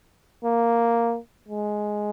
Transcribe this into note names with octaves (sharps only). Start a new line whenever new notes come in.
A#3
G#3